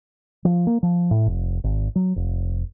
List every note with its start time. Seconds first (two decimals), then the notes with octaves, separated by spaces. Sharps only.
0.45 F3
0.67 A#3
0.83 F3
1.11 A2
1.26 F1
1.64 G#1
1.96 F#3
2.16 F1